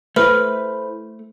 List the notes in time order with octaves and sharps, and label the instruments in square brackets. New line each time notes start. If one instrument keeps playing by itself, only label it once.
[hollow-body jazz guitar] A3 [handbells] E4 C5 [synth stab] B4 [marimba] F6